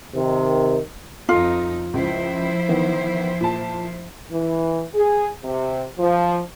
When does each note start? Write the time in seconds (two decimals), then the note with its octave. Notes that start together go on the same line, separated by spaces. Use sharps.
0.15 C3 D#3
1.29 F2 D#4 F4 A4
1.94 C#2 F3 E4 C5
2.69 D#3 E3 B3
3.41 A#2 A5
4.31 E3
4.95 G#4
5.44 C3
5.98 F3